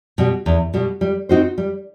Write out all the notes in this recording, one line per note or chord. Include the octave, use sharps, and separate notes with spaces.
B2 G3
E2
B2 G3
G3
C4 D#4 F#4 C5
G3